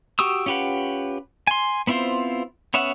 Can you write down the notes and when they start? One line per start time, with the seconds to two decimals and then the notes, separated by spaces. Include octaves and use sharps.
0.19 F#4 G4 C#6 D#6 E6
0.46 C#4 F4 G4 B4 F#5
1.47 G#5 C6
1.87 B3 C4 E4 F4 C5
2.74 B3 C#4 C#5 E5 F#5